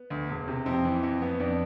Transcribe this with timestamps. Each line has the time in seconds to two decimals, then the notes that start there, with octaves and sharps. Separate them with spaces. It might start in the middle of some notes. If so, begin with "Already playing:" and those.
Already playing: B3
0.10 D2
0.29 E1
0.48 C3
0.66 F2 C4
0.85 E3
1.03 F2
1.22 B3
1.40 F2 D4